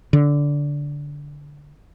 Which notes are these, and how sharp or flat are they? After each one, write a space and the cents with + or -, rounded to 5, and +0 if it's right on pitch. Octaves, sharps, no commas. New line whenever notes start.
D3 -15